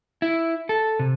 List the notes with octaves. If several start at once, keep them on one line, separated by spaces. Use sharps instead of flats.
E4
A4
C3